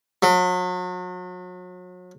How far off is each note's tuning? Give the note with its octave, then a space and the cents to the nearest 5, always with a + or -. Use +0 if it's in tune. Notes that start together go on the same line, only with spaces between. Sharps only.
F#3 -35